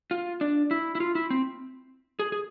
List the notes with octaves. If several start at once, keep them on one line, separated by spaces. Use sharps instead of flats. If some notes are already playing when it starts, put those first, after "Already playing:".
F4
D4
E4
E4
F4
E4
C4
G#4
G#4